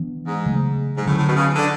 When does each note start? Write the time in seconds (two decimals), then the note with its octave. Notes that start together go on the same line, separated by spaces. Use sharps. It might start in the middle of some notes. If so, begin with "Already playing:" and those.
Already playing: E3 B3 D4
0.27 G#2
0.46 C#3 F#3 A3
0.96 G#2
1.06 A2 D3 F#3 C#4
1.18 A2
1.27 B2
1.36 C#3
1.56 D3